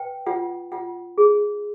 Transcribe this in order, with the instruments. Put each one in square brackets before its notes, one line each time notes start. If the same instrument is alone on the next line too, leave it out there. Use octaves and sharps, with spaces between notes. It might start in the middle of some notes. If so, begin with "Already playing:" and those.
Already playing: [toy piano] B4 G5
F4 F#5
F4 F#5
G#4